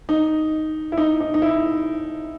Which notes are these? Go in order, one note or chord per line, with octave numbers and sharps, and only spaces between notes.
D#4
E4
D#4
D#4
D#4
E4